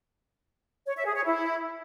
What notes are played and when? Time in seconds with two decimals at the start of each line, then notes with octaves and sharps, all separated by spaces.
0.86 C#5
0.96 E5
1.06 G#4
1.15 C#5
1.25 E4